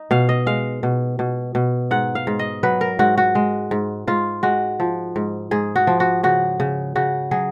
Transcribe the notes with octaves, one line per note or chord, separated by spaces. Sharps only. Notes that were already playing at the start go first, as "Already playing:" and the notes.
Already playing: D#4
B2 F5
D#5
G#3 F5
B2
B2
B2
G#2 F#5
F5
G#2
D#5
F#3 B4
A#4
G#2 F#4
F#4
G#3
G#2
G#2 F4
G#3 F#4
F3
G#2
G#2 G#4
F#4
F3
F#4
C#3 F#4
C#3
C#3 F#4
F#3 G#4